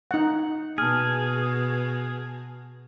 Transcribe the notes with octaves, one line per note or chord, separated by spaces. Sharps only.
D#4 F#5
B2 G#4 A5 F6